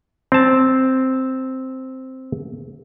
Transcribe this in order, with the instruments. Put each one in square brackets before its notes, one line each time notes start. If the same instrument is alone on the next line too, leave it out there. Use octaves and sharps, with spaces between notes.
[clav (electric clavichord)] C4 A5